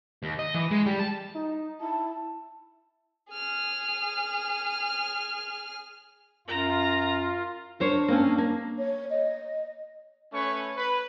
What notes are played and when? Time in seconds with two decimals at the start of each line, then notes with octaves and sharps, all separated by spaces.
0.23 D#2
0.39 D#5
0.54 E3
0.71 G#3
0.86 G3
0.99 A5
1.35 D#4
1.81 E4 A5
3.32 G#4 F6
6.48 F#2 F4 A#5
7.80 D4 A#4 C5 C#5
8.08 A#3 C4 C#4
8.38 A#3
8.78 C#5
9.10 D#5
10.33 A3 C#4 B4 C#5 C#6
10.77 B4